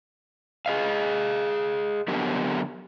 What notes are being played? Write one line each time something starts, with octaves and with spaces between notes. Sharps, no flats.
G#4 D#5 F5
D3 F#3 B3 G4 A#4